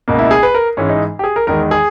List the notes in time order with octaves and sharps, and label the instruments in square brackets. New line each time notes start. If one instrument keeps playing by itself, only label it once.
[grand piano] C#2 B2 A#3
E4
G#4
B4
A#4
G#2 E3 G#3 C#4
D#4
G4
G#4
A#4
E2 D#3 G#3 A#4
G#4